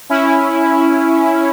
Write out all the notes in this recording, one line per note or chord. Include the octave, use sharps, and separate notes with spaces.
C#4 E4